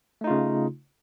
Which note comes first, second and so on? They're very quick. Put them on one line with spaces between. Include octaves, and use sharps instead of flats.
A3 D#4 F4 C#3